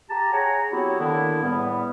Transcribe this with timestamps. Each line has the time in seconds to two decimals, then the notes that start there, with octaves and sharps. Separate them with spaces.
0.10 G4 A5 A#5
0.33 G#4 C#5 F#5 G#5 A#5
0.72 F#3 B3 C4 E4 F#4 G4
0.99 D3 D#3 A#3 B3 D4 E4
1.43 E2 A2 G3 B3